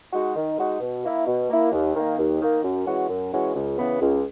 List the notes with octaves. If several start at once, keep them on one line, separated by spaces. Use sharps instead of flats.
G#3 D#4 F#4
D#3
G#3 D#4 F#4
B2
A#3 E4
B2
A#3 E4
D#2
D#3 A#3
D#2
D#3 A#3
F#2
E3 G#3 C#4 F#4
F#2
E3 G#3 C#4 F#4
C#2
C#3 E3 B3
C#2